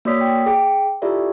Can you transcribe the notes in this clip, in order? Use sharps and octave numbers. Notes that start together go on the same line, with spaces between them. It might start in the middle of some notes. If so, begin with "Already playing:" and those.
A#3 F#4 C#5 D5 D#6 B6
G5
G#4 G5
E4 F4 G4 A4 D5 E5